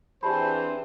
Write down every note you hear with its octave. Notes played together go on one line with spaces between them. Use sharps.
E3 C4 D4 G4 G#4 C5 A5 B5